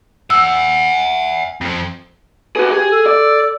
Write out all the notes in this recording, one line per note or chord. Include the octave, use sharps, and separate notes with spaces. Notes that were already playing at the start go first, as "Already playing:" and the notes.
E5 F#5 E6
F2 F3
F#4 G#4 B4
G4 G#4
A4
D5